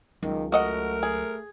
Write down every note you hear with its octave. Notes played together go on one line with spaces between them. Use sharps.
C#2 D#3 F#3
A3 F#4 A#4 D#5 F#5
G#4